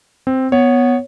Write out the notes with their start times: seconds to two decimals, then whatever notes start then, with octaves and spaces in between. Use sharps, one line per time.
0.27 C4
0.52 B3 C#5